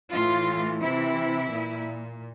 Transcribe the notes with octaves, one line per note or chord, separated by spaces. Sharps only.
A2 E3 F4
C3 E3 E4
A#2